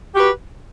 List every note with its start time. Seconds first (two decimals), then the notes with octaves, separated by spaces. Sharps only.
0.14 G4
0.16 F#4
0.19 B4